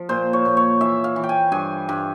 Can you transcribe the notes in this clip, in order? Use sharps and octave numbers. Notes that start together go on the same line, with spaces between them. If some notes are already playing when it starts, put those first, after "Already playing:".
Already playing: F3
A#2 C5
C#5
A#2
C#5
E3 E5
F5
E3
G5
G#5
G2 G#5
G2